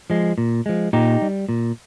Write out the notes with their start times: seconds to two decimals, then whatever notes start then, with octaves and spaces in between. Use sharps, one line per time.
0.10 F3 G#3
0.38 A#2
0.66 F3 G#3
0.93 A#2 D#4 G4
1.22 G3
1.49 A#2